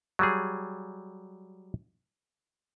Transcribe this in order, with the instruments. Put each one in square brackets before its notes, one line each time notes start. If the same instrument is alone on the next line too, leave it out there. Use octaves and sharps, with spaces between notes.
[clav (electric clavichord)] F#3 G3 G#4